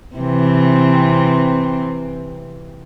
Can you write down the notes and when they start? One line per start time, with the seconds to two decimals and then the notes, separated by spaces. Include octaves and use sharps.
0.17 C3 E3 C4